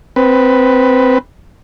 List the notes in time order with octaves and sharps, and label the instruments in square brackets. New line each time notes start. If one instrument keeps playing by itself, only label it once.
[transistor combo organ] C4 B4